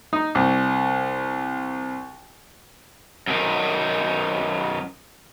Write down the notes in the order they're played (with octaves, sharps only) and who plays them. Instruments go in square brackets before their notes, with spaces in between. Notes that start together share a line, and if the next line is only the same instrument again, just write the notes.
[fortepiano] D#4
C2
[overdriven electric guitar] F#2 D#3